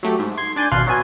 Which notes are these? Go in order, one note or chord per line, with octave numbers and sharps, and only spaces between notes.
F#3 A3 G4
G#2
C6 G#6
D4 D5 G#5 G6
G#1 B2 F5 C6 F#6 C7
F#3 B3 G#5 D#7